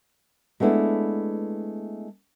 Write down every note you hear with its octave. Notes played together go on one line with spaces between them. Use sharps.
G#3 A3 B3 D4 E4